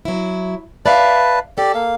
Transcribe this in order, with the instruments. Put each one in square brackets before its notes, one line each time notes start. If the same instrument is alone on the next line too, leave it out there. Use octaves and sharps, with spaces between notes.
[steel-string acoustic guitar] F#3 E4
[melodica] B4 A5 [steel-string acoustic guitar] D5 E5 F5
[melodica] G4 D5 [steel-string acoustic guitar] A4
[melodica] A#3 F5